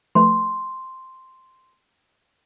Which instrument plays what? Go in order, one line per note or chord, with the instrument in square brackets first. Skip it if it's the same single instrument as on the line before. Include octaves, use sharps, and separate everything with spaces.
[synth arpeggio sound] F3 A3 B4 [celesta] C6